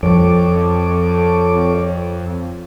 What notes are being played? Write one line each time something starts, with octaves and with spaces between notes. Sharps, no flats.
F2 F3 A4 C#5 D6